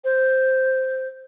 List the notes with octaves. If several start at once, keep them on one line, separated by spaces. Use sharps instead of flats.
C5